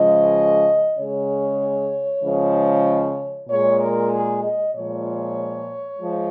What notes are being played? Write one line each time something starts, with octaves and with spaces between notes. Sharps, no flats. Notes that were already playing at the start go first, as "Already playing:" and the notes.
Already playing: C#3 F3 G#3 D#5
C#3 G#3 C#5
C#3 F3 G#3
A#2 G#3 C#5
A#4
G#4
D#5
A#2 F3 G#3 C#5
F3 G#3